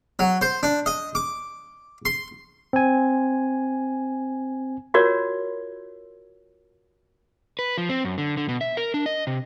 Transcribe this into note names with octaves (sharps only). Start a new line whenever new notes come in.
F#3
C5
D4
D#5
D6
C6
C4 G#5
F4 F#4 A#4 C#5 D5
B4
F3
C4
F#2
D3
D3
B2
E5
A#4
D4
D#5
C3